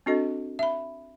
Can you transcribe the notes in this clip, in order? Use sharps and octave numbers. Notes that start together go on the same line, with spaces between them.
C4 D4 F#4 A4 D#5
E5 B5